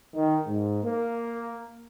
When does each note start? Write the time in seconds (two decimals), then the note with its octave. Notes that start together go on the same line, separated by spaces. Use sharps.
0.14 D#3
0.46 G#2
0.83 A#3